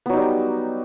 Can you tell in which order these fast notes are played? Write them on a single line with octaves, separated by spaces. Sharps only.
B3 F#3 D#4 G3